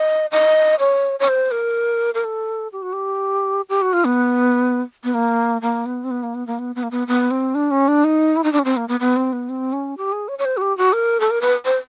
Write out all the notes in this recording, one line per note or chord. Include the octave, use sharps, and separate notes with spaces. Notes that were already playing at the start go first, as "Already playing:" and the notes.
Already playing: D#5
D#5
C#5
C#5
C5
A#4
A#4
A4
G4
F#4
G4
G4
F#4
F4
B3
B3
A#3
A#3
B3
C4
B3
A#3
B3
A#3
B3
B3
A#3
B3
B3
C4
D4
C#4
D4
D#4
E4
D#4
D4
C#4
C4
A#3
B3
B3
C4
B3
C4
C#4
G4
G#4
C#5
C#5
C5
F#4
G4
F#4
A#4
A4
A#4
B4
C5